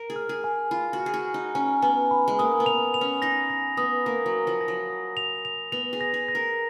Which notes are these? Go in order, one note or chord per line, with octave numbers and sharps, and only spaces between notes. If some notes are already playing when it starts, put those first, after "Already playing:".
Already playing: A#4
G#4
F6
G#4
G#5
F4 B5
F#4
F6
G#4
F#4
F6
D#4
C#4 G#5
B3 G#5
B5
G#3
A#3 D#6
B3
F7
F7
C#4
D#4 A#6
A#6
B3 D#6
A#3 D#6
F#3
D#6
F3
A#6
F#3
D#6
F7
F7
B3 F7
G#4
A#6
G#4
A#6
A#4